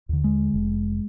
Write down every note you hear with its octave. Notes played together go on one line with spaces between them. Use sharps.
D#2 D3
G#3
F1